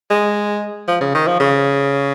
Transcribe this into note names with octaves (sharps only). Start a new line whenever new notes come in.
G#3
F3
C#3
D#3
F3
C#3